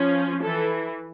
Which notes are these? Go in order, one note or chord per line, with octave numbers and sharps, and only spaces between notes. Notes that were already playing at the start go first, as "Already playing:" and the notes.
Already playing: F3 C#4
E3 A4